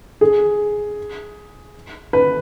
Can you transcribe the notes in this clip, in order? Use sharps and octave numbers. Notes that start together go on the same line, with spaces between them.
G#4
B4